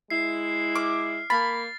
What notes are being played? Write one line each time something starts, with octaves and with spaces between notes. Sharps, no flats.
G#3 E4 C7
D6 F6
A#3 B5 A6